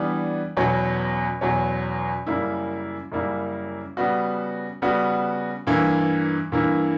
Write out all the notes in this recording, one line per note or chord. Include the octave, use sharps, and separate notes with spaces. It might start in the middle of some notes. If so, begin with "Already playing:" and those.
Already playing: E3 G3 B3 D4
E2 B2 F#3 C#4
E2 B2 F#3 C#4
F#2 C#3 G3 A#3 E4
F#2 C#3 G3 A#3 E4
C#3 G3 B3 F#4
C#3 G3 B3 F#4
G2 E3 A#3 E4
G2 E3 A#3 E4